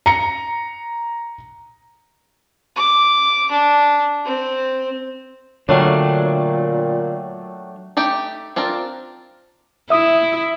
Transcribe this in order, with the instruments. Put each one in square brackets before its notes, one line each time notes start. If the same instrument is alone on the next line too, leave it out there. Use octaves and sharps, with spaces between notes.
[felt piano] A#5 C#7
[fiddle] D6
D4
C4
[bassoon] A#2 [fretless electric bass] D3 [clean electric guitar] F#3 A3 D4 [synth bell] C#5 G5
[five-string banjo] A3 D#4 G4 G5
C4 D4 F4 A#4
[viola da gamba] E4 [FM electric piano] E5 D#6